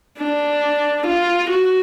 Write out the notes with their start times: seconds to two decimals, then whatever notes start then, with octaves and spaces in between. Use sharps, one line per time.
0.18 D4
1.07 F4
1.50 F#4